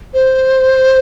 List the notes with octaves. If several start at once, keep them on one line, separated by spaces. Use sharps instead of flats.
C5